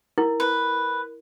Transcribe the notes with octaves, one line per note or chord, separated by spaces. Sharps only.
E4 A#4
B4